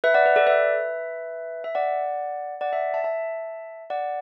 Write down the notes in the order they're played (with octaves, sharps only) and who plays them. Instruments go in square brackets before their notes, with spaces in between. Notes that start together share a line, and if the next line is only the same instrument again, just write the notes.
[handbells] B4 E5
D5 F#5
B4
A4 D5
B4 E5
E5
D5 F#5
D5 F#5
E5 A5
E5 A5
E5 A5
D5 F#5